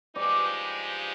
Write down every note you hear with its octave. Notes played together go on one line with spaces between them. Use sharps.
G2 F3 G#3 D#4 G4 D5